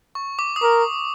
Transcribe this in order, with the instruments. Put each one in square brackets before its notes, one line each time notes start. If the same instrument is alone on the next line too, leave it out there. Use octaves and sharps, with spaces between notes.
[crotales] C#6
D6
D#6
[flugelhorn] A#4 [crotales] D6